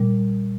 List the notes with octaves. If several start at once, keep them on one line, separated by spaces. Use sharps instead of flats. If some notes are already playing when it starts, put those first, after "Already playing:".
Already playing: A#2 G3